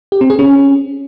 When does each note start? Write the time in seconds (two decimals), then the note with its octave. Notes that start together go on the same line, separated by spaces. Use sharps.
0.12 G4
0.21 C4
0.30 G#4
0.39 C#4